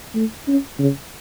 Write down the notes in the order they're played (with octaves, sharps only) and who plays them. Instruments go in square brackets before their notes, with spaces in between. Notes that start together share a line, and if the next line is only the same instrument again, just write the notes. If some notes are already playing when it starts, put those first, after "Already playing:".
[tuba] A3
C#4
C#3